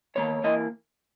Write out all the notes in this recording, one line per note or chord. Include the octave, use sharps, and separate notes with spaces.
E2 D#3 A#3 C#5
E3 A#3 D#5